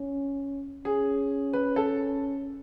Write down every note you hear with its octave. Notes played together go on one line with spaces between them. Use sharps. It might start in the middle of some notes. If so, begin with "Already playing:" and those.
Already playing: C#4
C#4 G#4
B4
A4